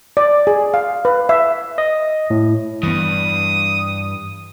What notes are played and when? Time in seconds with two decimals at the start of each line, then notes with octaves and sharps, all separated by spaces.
0.17 D5
0.47 G#4
0.74 F5
1.05 B4
1.29 E5
1.78 D#5
2.30 A2
2.83 G2 E3 B3 D#6